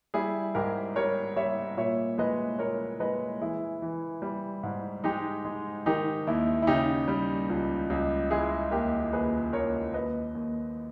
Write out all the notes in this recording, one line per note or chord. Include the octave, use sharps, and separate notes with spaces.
G3 E4 G#4
G#2 G4 A#4
G3 A#4 C#5
G3 C#5 E5
A#2 C#5 E5
G#3 B4 D#5
A#2 A#4 C#5
G#3 B4 D#5
E3 E4 G#4
E3
G3
G#2
G#3 D#4 G4
G#3
D#3 D#4 G4
D#2 E4
E4
C#3 D#4 G4
G3
C#2
C#2
G#3 E4 G#4
D#2 G4 A#4
D#2 G#4 B4
D#2 A#4 C#5
D#2 B4 D#5
D#2